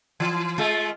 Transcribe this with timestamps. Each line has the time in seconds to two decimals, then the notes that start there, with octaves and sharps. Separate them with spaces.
0.20 E3
0.58 G#3 A3 F4